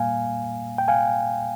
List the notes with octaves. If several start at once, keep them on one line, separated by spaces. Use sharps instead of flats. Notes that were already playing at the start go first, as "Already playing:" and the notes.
Already playing: A#2 G3 A#3 F5 G#5
G5
F5 G#5